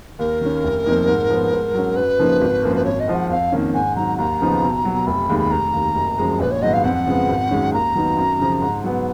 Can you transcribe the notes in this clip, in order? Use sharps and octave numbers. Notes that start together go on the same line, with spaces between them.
D#2 A#4
D#3 A#3 C#4
F1
F2 F3 A#3 D#4
G#2
F3 B3
G#2
F#3 C#4
F#2 B4
C#3 F3 A#3 D#4
G#1
F#2 F3 A#3
B4
G#1 C#5
D#5
G#2 F3
F#5
F2 F5
D#3 A#3 C#4
G#2 G#5
D#3 F#3 A#5
D#2 A#5
C#3 F3 B3 D#4
B1
B2 F#3
F1 B5
D#2 D#3 G#3
B5
F1 A#5
D#2 D#3
F#1
F#2 F3 G#3
A#1 B4
C#5
G#2 D#3 F#3 B3 D#5
F5
F2 F#5
C#3 F3 G#3 B3
G#1
F#2 D#3 G#3 C#4
D#2 A#5
D#3 F#3 B3 D#4
F#2
C#3 F3
G#2
F#3 B3